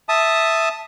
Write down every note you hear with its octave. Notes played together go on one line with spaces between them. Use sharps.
E5 A5 D#6